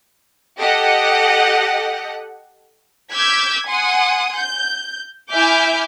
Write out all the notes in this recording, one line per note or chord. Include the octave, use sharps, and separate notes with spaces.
G4 A4 D#5 F#5
D6 E6 F6 G6 G#6 B6
F#5 G#5 C6 D#6
G6
E4 E5 G#5 D6 F6 G6